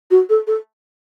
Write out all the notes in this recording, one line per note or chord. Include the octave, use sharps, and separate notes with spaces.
F#4
A4
A4